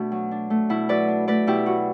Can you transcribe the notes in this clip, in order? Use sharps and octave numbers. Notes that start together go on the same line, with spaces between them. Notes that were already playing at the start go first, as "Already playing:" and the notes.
Already playing: B2 A3 D4 F#4
F#3
D4
A3
B2 E4
F#3 B4 D5
D4
A3 B4 D5
B2 E4 G4
F#3 F#4